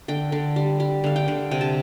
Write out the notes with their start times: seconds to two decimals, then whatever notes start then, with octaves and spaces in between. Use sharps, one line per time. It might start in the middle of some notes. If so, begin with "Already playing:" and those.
0.08 D3 G5
0.32 D3
0.56 G3
0.80 G3
1.04 D3 F5
1.16 G5
1.28 D3
1.51 C3 G5
1.61 A5